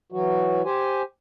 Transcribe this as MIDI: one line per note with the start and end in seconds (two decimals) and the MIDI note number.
0.12 0.62 52
0.12 0.62 54
0.12 0.62 66
0.65 1.02 67
0.65 1.02 72
0.65 1.02 80